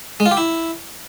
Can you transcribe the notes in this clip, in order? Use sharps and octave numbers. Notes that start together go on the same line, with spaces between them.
G#3
F4
G4
E4